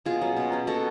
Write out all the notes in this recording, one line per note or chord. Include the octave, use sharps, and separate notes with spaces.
B2 F4 G#4
F#3 C#4
B2
F#3 C#4
B2 F#4 A4